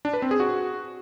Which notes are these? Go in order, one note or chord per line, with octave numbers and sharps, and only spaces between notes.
D4
B4
C4
G#4
F#4